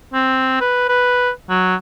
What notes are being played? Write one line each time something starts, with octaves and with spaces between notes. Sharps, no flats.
C4
B4
B4
F#3